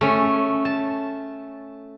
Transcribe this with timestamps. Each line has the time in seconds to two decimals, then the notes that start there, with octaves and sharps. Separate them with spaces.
0.01 A3 C#4
0.65 A5